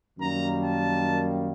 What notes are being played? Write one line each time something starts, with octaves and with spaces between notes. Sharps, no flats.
F#2 D#3 G3 A#3 A#5
A5